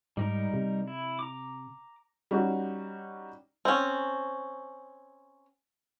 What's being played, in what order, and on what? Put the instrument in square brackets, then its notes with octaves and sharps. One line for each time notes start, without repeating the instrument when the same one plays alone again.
[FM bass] G#2 [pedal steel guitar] G3 D#4 A#4
[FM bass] C3
[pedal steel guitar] E4
A#5 D6
[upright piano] G3 C#4 D#4 F#4
[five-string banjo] C4 C#4